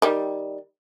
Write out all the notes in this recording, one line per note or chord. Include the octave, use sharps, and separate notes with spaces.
D#3 G3